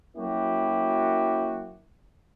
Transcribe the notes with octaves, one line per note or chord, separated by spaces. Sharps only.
F#3 A#3 C#4 E4 F#4 G4